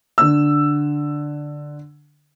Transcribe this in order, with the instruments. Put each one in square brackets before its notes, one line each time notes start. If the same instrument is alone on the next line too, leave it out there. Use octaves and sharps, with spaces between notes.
[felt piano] D3 E6